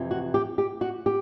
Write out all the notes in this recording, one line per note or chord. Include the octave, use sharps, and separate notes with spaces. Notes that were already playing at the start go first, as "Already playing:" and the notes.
Already playing: F2 C3 E3
F#4
G4
G4
F#4
G4